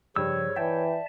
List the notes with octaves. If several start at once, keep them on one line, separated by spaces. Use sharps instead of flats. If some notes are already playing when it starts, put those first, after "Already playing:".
G2 C#3 F3 C#5 E6
E3 D5 E5 G5 A5